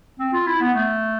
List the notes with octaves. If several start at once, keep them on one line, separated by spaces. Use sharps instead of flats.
C4
F4
E4
B3
A3